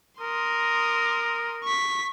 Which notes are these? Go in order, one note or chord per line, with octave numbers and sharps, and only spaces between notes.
A#4 C6 D#6
C#6 B6